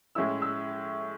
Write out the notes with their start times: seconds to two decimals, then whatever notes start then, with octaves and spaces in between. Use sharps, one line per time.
0.15 A2 G#3 C#4 E4 E6
0.42 E6